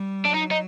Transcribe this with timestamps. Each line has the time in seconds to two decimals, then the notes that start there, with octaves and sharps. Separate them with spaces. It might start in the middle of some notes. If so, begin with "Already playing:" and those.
Already playing: G3
0.25 F#3 D4
0.34 D#4
0.51 D#4